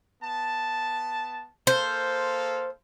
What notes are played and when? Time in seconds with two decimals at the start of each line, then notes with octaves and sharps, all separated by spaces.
0.22 B3 A5
1.67 A#3 A4 C5 F5